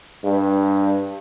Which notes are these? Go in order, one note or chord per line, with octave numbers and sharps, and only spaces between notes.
G2